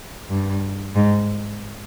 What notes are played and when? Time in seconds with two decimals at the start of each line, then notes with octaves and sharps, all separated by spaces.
0.30 G2
0.96 G#2